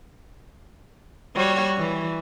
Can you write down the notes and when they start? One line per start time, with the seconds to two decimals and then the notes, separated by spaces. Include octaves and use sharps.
1.36 G3 F#4 C#5
1.78 E3